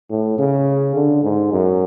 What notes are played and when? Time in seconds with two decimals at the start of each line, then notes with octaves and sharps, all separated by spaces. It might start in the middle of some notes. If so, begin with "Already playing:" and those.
0.10 A2
0.38 C#3
0.95 D3
1.23 G#2
1.52 F#2